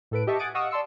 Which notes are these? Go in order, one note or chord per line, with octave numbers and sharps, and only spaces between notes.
A2 A4 B4 D7
G4 D#5 E5 A5 C#6
F#5 G#5 D#6 A6 D7
D#5 F5 F#5 C#6 D#6 E6
D5 A5 C6 E6 C#7